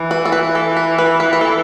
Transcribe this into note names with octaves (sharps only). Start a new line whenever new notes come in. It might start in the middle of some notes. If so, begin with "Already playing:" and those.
Already playing: E3
B4
A4
B4
A4
B4
B4
B4
B4
A4